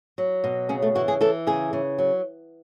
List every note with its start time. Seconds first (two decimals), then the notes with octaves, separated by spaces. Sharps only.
0.18 F#3
0.44 B2
0.69 C#3 C#4
0.82 A3
0.95 E3 F#4
1.08 G#4
1.21 E3 A4
1.47 C#3 G#4
1.73 C#3
1.98 F#3